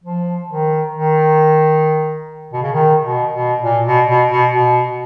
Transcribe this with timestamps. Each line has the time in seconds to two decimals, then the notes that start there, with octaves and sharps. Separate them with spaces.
0.04 F3
0.49 D#3
0.94 D#3
2.53 B2
2.62 C#3
2.73 D#3
3.03 B2
3.32 B2
3.62 A#2
3.85 B2
4.07 B2
4.29 B2
4.52 B2